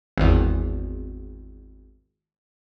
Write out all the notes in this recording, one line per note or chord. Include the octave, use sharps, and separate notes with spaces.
G#1 E2